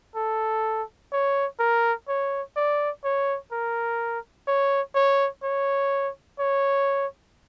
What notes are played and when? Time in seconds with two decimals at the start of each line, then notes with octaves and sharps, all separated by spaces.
0.16 A4
1.12 C#5
1.59 A#4
2.08 C#5
2.56 D5
3.04 C#5
3.52 A#4
4.48 C#5
4.95 C#5
5.43 C#5
6.39 C#5